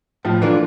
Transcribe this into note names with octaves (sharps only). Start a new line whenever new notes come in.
A2 F3 F4
D3 E3 A#3 D4 F4